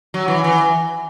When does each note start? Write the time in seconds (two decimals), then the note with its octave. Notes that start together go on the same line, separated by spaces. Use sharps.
0.14 F#3
0.28 E3
0.44 E3